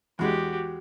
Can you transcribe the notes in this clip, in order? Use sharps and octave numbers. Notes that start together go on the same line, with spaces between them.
E2 G#3 F#4 G4